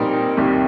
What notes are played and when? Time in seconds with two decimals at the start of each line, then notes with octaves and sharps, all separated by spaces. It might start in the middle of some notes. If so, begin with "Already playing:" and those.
Already playing: A#2 G3 C4 D#4 A#4
0.37 C2 C3 D#3 G3